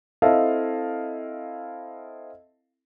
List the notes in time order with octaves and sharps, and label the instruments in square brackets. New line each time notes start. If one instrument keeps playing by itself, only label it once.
[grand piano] C4 E4 A4 D#5 F5 A5